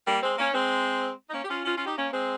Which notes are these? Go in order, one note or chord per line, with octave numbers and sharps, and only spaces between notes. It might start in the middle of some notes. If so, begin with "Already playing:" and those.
G3 A#3
G#3 C4
A#3 C#4
G#3 C4
D#4
A#3 C#4
G4
C#4 F4
C#4 F4
C#4 F4
D#4 G4
A#3 C#4
G#3 C4